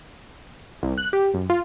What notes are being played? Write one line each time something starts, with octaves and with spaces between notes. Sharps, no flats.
C2
F#6
G4
F#2
F4